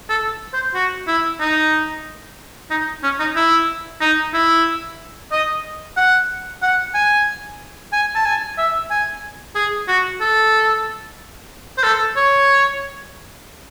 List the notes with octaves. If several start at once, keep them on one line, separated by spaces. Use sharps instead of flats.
A4
C5
F#4
E4
D#4
D#4
C#4
D#4
E4
D#4
E4
D#5
F#5
F#5
G#5
G#5
A5
G#5
E5
G#5
G#4
F#4
A4
C5
A4
C#5